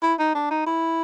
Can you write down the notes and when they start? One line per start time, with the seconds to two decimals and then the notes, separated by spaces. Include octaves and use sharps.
0.03 E4
0.19 D#4
0.35 D4
0.51 D#4
0.67 E4